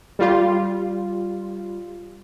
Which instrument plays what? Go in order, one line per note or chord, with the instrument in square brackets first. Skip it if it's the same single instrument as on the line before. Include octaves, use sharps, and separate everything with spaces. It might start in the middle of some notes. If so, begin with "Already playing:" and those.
[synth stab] G3 F4